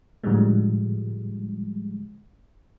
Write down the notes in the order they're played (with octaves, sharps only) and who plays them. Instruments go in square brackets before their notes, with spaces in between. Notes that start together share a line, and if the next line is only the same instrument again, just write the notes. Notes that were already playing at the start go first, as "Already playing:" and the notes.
[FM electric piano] A2 D3 F3 G3 G#3